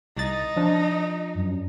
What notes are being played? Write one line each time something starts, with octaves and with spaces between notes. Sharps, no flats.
C2 D#4 A6
F3 D4
F#2